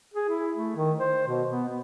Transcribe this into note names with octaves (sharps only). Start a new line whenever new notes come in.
G#4
E4
A3
D#3
C5
B2
B3
B3